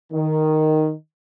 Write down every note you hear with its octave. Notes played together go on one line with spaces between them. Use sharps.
D#3